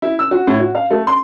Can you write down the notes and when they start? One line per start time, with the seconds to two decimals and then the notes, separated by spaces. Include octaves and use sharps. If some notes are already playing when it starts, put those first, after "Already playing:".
0.02 E4
0.19 E6
0.31 F#4
0.47 A2
0.60 F#4
0.75 F5
0.91 A3
1.07 C6